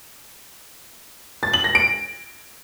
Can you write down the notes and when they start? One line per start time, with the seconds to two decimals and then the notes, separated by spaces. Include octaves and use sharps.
1.43 A6
1.53 F#7
1.64 A#6
1.75 D7